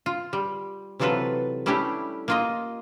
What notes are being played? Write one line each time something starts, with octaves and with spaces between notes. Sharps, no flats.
F4
G3
C3 E3 F#3 F4 A4 B4
G3 A3 C#4 D4 E4 G4
A#3 F4 D#5